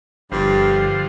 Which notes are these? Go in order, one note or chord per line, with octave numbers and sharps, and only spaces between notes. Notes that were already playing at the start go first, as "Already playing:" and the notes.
G1 G2 D3 F3 G4 C5